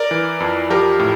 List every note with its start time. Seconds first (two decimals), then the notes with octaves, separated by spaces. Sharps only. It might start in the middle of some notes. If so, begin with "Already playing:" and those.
Already playing: A#4 D5
0.11 E3
0.40 F2
0.70 F3 G4 A#4
0.99 A2